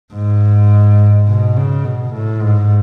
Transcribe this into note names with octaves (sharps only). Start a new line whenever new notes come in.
G#2
B2
C#3
B2
A2
G#2